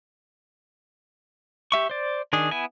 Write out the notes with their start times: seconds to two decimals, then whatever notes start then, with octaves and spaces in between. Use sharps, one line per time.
1.72 G4 E5 C#6
1.90 C5 D5
2.33 D#3 D4 G#4
2.51 B3 E4 G#5